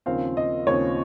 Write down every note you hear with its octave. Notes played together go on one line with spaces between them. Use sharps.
D#2 C#3 F3 C4 F5
D#5
D#2 C#3 F3 C4 C#5